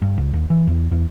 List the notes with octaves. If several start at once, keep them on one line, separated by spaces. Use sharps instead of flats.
G2
C#2
D#2
E3
E2
E2